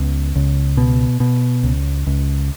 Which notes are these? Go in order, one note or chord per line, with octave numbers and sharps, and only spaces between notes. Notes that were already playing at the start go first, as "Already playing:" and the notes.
Already playing: C#2 B3
C#2
B2
B2
C#2
C#2